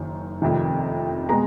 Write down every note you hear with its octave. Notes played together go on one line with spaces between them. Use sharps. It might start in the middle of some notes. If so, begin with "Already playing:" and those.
Already playing: F#1 F#2 D#3
F1 F2 C3 D#3
B2 G#3 B3 A#5